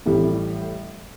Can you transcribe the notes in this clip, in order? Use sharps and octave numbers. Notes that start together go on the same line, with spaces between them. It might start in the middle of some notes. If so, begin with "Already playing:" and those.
A1 A2 G3